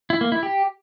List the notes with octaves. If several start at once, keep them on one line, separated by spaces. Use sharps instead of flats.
E4
A#3
E4
G4